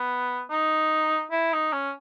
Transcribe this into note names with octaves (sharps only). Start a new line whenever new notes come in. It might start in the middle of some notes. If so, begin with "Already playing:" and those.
Already playing: B3
D#4
E4
D#4
C#4